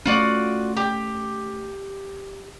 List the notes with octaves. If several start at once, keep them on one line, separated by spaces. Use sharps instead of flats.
A3 C#4 F4 F#4 D5
G4